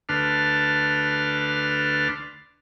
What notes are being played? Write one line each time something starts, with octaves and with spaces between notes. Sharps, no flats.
D2 D4 B4 A5 C6 F6